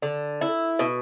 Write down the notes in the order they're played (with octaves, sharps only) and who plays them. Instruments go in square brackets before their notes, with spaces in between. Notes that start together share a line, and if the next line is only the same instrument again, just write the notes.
[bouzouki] D3
E4
B2